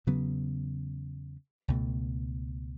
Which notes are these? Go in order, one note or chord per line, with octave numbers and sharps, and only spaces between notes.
E2 C#3 F#3 B3
C#2 B2 A3